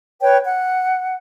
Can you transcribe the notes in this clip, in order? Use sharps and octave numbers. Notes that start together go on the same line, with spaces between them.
B4 C#5 G5
F#5